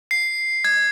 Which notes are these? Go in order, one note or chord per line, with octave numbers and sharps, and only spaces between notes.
C7
G#6